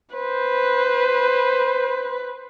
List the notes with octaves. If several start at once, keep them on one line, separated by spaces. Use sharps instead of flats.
B4 C5